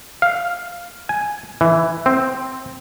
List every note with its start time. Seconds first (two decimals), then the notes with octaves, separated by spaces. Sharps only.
0.22 F5
1.09 G#5
1.61 E3
2.06 C4